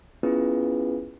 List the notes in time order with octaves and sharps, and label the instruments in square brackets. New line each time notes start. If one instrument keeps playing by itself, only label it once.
[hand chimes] B3 C#4 E4 F4 G#4 B4